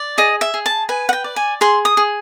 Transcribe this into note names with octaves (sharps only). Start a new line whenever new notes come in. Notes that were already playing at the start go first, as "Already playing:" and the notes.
Already playing: D5
G#4 D#5
E5
G#4
A5
B4 G#5
F#5
G5
D5
G#5
G#4 C6
D#6
G#4